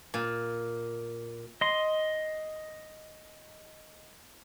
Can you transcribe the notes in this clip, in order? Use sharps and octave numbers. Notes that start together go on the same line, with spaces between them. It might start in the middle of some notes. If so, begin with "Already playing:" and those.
A#2
D#5 C6